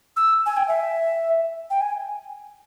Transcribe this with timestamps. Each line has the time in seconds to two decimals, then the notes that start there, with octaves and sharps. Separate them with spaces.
0.17 E6
0.46 G#5
0.57 G5
0.68 E5
1.70 G5
1.81 G#5